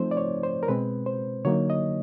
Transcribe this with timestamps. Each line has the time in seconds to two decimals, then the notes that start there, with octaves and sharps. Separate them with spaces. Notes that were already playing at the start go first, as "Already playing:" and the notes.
Already playing: F3 A3 C4 D#4 C5
0.11 D5
0.17 C#5
0.43 C5
0.63 A#4
0.68 B2 G#3 C4 B4
1.06 C5
1.45 D3 F#3 A#3 D#4 C#5
1.70 D#5